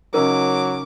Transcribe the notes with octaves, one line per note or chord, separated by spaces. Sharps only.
C#3 F#3 C#4 D#4 A#4 D6